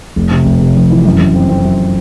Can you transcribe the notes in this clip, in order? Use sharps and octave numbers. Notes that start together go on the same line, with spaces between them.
F1
C3
F1
C3
F2
E3
F#2
F#2
C4
C4
F#2